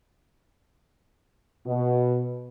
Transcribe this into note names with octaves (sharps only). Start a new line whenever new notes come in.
B2